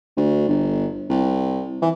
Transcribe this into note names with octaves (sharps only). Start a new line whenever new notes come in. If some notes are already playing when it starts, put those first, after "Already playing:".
D2
G1
C2
E3